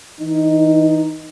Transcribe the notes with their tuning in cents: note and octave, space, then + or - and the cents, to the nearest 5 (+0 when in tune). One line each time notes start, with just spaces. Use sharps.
E3 -30 D#4 +0